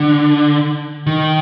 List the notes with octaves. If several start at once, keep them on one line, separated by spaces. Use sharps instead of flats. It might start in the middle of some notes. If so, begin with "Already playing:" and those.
Already playing: D3
D#3